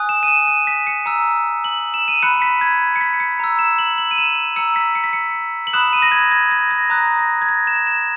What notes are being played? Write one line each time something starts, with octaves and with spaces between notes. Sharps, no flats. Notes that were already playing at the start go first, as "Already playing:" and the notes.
Already playing: G#5 D#6 F#6
E7
D#7
E7
D#7
B6
C#7
A#5 E6
F#7
E7
D#7
B5 F#6 C#7
B6
G#6
C#7
B6
C#7
A#5 E6
E7
F#7
F#7
D#7
E7
A#5 E6 C#7
B6
C#7
B6
C#7
F#7
B5 D#6 F#6 E7
D#7
A#6
G#6
G#6
A#6
A#6
A#5 D#6 F#6
A#6
G#6
A#6
E7
E7